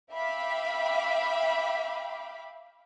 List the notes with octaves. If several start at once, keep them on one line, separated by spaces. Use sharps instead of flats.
E5 F5 G5 B5 D6